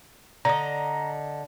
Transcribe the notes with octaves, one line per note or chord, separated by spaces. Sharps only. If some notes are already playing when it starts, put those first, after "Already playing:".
D3 D#5 A#5